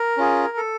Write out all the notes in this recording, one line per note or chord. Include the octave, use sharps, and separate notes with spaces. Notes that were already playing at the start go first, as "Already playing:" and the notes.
Already playing: A#4
C#4 F4 G#4
A4